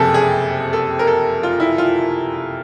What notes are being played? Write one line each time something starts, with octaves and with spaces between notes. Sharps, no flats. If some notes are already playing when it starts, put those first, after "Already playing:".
Already playing: F#1 F2 C3 G#4 A4
G#4
A4
A#4
A4
F4
E4
F4